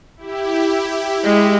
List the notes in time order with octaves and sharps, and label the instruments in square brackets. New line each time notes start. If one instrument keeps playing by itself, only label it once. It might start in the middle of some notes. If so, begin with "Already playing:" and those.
[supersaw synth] E4 G4
[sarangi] G#3